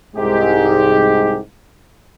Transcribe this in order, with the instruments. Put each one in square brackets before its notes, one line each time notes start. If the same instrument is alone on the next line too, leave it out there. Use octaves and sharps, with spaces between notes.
[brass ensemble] C2 G#2 G#3 G4